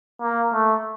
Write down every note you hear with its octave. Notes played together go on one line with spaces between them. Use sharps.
A#3
A3